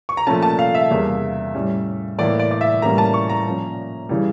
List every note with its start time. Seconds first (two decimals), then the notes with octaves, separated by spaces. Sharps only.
0.09 C#6
0.17 A#5
0.27 A#2 F3 A3 C#4 A5
0.42 A5
0.59 F5
0.75 E5
0.90 E2 C#3 G3 A#3
1.54 A2 G3 C#4
2.18 A2 E3 A#3 D5
2.39 D5
2.51 D5
2.61 E5
2.82 A2 E3 G3 A#3 C#4 A#5
2.98 A5
3.14 C#6
3.29 A#5
3.46 A#2 F3 C#4
4.09 C#3 E3 G3